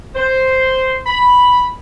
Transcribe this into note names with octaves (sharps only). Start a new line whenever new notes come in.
C5
B5